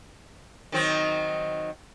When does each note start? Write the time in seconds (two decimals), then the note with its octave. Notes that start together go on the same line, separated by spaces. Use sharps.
0.72 D#3 F#3 C4